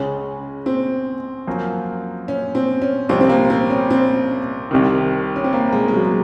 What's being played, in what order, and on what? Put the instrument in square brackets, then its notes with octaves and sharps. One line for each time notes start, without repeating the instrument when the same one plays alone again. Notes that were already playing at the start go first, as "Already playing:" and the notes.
Already playing: [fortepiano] C#2 C#3 G#3 [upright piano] C#4
[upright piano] C4
[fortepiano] F#2 F3 A#3
[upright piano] C#4
C4
C#4
[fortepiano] C2 C3 F3 [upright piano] C4
[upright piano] C4
A#3
C4
C#4
C4
[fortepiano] C2 C3 D#3
[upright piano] C#4
C4
A#3
A#3
G#3
G#3
F#3